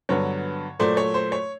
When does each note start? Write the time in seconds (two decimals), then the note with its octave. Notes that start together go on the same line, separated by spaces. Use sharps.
0.09 G2 D3 F#3 B3 C#5
0.79 A#2 F#3 A3 C5 D5
0.97 C#5
1.14 C5
1.32 C#5